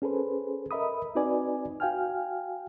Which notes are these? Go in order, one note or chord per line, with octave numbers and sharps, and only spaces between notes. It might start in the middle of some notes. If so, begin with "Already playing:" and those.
C#4 G#4 A4 B4 C5
A#4 D#5 E5 B5 D#6
C4 D#4 F#4 B4 D5 G#5
F#4 F5 G5 G#5 F6